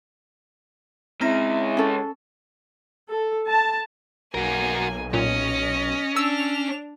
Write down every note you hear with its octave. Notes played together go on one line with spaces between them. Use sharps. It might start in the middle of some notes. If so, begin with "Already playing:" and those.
C#3 G#3 C4 E4 A#5 A#6
C#4 A4
A4
A5
B1 A#3 F#4 A#4 G#5
A#2 C#4 D#5
D4 E6 F7